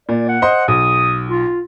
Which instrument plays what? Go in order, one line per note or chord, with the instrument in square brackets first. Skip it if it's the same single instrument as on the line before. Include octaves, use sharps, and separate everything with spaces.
[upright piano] A#2 [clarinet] D5
[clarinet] F#5
[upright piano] C5 D#5 C6
[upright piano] B1 [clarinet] D#6
[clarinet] F4